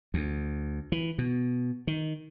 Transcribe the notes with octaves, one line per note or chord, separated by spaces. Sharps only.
D2
E3
B2
D#3